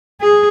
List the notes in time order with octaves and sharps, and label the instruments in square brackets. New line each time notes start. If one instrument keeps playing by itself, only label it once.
[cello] G#4